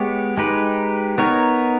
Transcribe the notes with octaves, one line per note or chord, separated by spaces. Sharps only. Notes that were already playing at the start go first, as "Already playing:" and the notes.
Already playing: G#3 B3 G4 C#5
G#3 D#4 G4 B4
B3 D#4 A#4 C#5